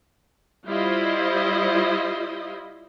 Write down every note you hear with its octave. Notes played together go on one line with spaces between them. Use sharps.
G3 E4 F4 C5 D#5